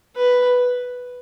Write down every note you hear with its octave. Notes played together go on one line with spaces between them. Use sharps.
B4